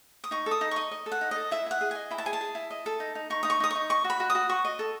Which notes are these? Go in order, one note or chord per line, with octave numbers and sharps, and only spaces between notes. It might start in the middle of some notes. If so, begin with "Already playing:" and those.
D#6
D#4 C#6
A4
D#6
D#4
D#5 C#6
D#5
A4
F#5
D#4
A4 D#5
E4 E5
E4 F#5
G#4
D#5 G#5
E4 B5
A5
G#4 G#5
A5
G#4
E4
D#5
A4
D#4
D#4
D#4 C#6
D#4 D#6
C#6
D#4 D#6
D#4 C#6
D#5 C#6
F#4
B5
F#4
D#6
F#4
F#4 C#6
D#5
A4